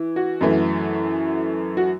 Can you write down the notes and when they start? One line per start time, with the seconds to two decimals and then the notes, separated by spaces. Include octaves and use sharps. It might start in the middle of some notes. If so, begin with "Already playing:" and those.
Already playing: E3
0.16 F#4
0.41 F#2 E3 A3
1.77 F#4